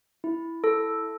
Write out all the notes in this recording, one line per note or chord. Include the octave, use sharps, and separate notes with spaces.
E4
A4